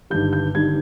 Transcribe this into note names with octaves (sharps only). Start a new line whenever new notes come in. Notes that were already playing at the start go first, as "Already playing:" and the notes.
G1 G2 D#3 G3 G6
G6
G1 G2 D#3 G3 G#6